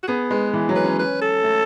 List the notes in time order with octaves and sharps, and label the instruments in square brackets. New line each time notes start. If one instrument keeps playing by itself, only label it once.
[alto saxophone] F#4
[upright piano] B3 [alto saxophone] G#4
[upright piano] G#3 [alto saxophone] B4
[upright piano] E3
F#3
[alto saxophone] B4
[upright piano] C#4
[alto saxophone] B4
A4
[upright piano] A3